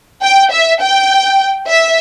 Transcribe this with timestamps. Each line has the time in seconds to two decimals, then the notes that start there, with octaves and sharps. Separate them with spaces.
0.22 G5
0.51 E5
0.81 G5
1.69 E5